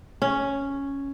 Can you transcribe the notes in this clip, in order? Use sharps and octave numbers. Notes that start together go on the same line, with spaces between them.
C#4